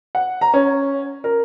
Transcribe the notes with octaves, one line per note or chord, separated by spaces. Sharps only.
F#5
A#5
C#4
A#4